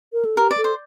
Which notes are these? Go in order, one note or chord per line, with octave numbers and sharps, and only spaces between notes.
A#4
A4
G4 A#4
D5
A4
C5